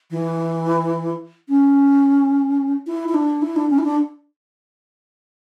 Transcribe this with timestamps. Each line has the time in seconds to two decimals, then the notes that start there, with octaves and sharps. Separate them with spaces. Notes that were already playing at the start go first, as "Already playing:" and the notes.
0.11 E3
1.49 C#4
2.87 E4
3.09 E4
3.14 D4
3.42 E4
3.56 D4
3.70 C#4
3.78 E4
3.84 D4